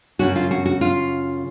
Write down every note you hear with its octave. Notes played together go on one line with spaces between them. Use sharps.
F#2 C#3 F#4
F4
F#4
F#4
F4